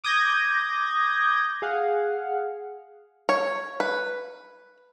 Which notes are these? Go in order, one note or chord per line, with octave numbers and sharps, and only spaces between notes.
D6 D#6 G6 G#6 A#6
G#4 F5 F#5
C#5
B4